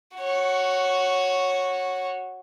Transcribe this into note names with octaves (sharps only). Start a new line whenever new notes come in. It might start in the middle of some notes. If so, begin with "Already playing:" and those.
F#4 C#5